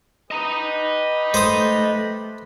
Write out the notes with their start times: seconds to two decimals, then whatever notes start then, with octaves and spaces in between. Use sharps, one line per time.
0.31 G4 B4 D#5 A#5 B5
1.34 A3 C5 D#6